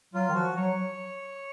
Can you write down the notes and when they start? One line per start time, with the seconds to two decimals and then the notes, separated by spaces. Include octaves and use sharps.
0.14 F#3 F4
0.29 D#3
0.35 F3 F#4
0.56 F#3 C#5